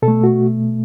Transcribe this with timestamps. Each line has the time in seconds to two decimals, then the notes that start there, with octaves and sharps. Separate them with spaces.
0.02 B2 A4
0.08 A3
0.24 F#4